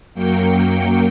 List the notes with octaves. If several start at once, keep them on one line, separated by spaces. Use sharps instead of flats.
F#2 F#3 A#3 G5 C#7